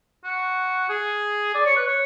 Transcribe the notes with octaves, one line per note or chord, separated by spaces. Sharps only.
F#4
G#4
D5
C#5
B4
C#5